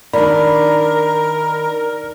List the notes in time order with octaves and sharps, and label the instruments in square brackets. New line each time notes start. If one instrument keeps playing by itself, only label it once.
[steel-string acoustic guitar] D#3 D4 [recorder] A#4 [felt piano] D5 [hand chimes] B5